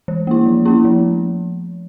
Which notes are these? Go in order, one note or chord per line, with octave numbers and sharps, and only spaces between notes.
E3
A#3 E4
F3
A#3 C#4 E4
F3